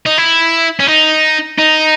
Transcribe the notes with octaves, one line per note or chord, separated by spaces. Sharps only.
D#4
E4
C#4
D#4
D#4